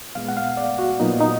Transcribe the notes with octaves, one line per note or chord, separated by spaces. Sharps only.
A#2 G#3 B3 F5
F#5
F5
D5
F#4
A#2 F#3 B3 D#4
D#4